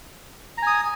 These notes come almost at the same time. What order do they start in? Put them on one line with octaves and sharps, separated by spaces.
A#5 G#5 D#6